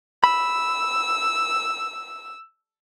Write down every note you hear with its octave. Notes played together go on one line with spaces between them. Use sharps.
B5 E6